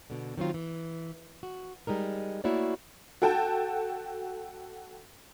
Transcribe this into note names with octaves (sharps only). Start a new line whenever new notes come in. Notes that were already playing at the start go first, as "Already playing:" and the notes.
B2 D3
D#3 F#3 C4 F4
E3
F#4
G3 G#3 D#4 A#4
A3 A#3 E4 F#4 C#5 D5
F#4 A4 G5 A5